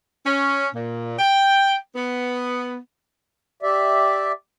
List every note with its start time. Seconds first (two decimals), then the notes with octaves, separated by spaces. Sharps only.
0.26 C#4
0.75 A#2
1.19 G5
1.96 B3
3.63 G4 D5 E5